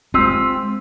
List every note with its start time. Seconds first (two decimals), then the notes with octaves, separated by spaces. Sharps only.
0.14 G#3 C4 F4 G4 E6